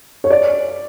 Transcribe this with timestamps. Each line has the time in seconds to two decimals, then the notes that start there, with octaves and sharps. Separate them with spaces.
0.24 C#5
0.30 D5